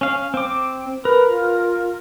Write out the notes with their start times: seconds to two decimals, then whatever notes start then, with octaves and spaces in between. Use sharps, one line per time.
0.01 C#4 F5
0.34 C4 D6
1.05 A#4 B4
1.29 F4